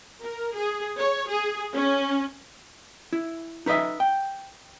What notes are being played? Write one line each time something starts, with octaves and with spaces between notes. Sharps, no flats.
A#4
G#4
C#5
G#4
C#4
E4
D#4 B4 C#5 D#5 E5
G5